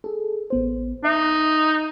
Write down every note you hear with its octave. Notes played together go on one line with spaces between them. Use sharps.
G#4 A4
A1 B3 C5
D#4 D#5 E5